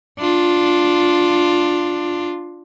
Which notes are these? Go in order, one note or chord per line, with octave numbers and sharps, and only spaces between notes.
D4 F4